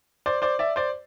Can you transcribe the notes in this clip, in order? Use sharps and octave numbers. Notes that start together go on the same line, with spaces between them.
C5 D5
C5 D5
D5 E5
C5 D5